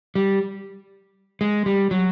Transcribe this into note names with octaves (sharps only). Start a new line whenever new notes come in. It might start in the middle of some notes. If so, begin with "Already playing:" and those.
G3
G#3
G3
F#3